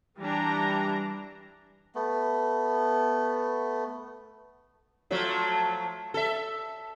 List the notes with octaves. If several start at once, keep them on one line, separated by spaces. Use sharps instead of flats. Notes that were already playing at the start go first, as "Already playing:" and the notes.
E3 G3 D4 A#5
A3 B3
F3 F#3 A3
A4 E5